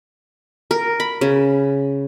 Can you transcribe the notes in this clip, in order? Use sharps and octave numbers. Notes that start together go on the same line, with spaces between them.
A#4
B5
C#3